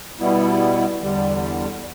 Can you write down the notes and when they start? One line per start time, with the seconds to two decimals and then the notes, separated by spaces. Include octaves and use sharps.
0.20 B2 G3 B3 E4
1.01 E2 D3 G3